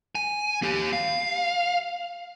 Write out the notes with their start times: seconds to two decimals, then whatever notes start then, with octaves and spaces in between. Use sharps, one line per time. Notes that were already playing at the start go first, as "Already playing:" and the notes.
0.15 G#5
0.62 A#3 G4
0.93 F5